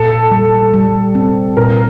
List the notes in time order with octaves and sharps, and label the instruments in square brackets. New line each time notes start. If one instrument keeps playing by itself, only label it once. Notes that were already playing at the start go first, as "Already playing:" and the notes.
Already playing: [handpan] A#2 [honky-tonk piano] A4
[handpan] G3
G3
C4
[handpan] A#2 [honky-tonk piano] A#4